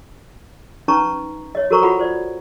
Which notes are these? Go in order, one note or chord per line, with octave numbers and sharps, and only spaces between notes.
C#4 D#4 B4 A5 A#5 C#6
C#5 D#5
F#4 A4 A#4 C5 A#5 C#6
F4 F#4 F#5 B5
C5 D5